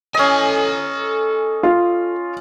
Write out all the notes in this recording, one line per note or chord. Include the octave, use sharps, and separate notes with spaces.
C#4 A4 D#5 G#5
F4